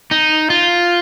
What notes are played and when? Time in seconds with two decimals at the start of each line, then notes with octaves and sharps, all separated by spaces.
0.11 D#4
0.50 F4